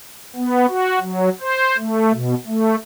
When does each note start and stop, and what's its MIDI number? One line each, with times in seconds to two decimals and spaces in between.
0.36 0.66 59
0.69 0.99 66
1.00 1.29 54
1.41 1.77 72
1.78 2.12 57
2.14 2.34 47
2.47 2.76 57